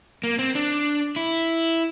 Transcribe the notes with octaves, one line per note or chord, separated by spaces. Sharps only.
A#3
C4
D4
E4